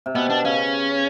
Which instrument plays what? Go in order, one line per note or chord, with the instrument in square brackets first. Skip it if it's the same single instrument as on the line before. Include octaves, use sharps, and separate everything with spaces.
[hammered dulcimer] C3
[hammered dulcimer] B2 [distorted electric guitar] B3
[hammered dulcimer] B2 [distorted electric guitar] D4
[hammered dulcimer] C#3 [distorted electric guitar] C#4